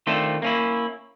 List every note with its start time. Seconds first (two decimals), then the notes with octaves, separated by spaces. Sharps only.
0.07 D#3 A3 C4 D4 F4 A4
0.42 A#3 C#4 E4